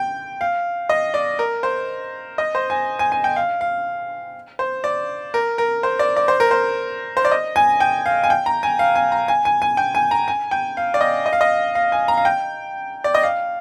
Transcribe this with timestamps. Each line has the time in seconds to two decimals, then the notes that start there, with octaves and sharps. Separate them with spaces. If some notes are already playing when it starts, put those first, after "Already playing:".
Already playing: G5
0.41 F5
0.89 D#5
1.14 D5
1.39 A#4
1.63 C5
2.38 D#5
2.55 C5
2.70 G#5
2.99 G#5
3.12 G#5
3.24 G5
3.36 F5
3.61 F5
4.59 C5
4.84 D5
5.34 A#4
5.58 A#4
5.83 C5
5.99 D5
6.16 D5
6.28 C5
6.40 A#4
6.51 C5
7.17 C5
7.25 D5
7.31 D#5
7.56 G#5
7.80 G5
8.06 F5
8.24 G#5
8.30 G5
8.46 A#5
8.63 G#5
8.79 F5
8.95 G#5
9.12 A#5
9.28 G#5
9.45 G#5
9.62 G#5
9.77 G5
9.95 G#5
10.11 A#5
10.28 G#5
10.51 G5
10.77 F5
10.94 D5
11.01 D#5
11.26 D#5
11.33 F5
11.41 D#5
11.75 F5
11.92 G#5
12.08 A#5
12.17 F5
12.25 G5
13.04 D5
13.15 D#5
13.23 F5